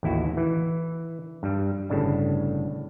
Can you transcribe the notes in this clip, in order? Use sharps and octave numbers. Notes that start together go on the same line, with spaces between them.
A1 D#2 E4 F#4
E3
G2 G3
G1 A2 C#3 D4 A5